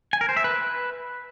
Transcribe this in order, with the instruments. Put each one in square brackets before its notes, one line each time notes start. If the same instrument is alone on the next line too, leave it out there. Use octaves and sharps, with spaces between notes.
[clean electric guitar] G#5
A#4
C5
E5
B4